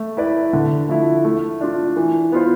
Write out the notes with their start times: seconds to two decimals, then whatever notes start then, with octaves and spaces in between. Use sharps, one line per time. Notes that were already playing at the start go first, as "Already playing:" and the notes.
Already playing: A3
0.17 E4 B4 D5
0.53 D3
0.89 F3 A3 E4
1.24 A3
1.61 D4 F4
1.96 E3
2.32 B3 F4 C5